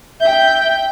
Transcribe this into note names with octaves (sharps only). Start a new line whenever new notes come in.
E5 G5 G6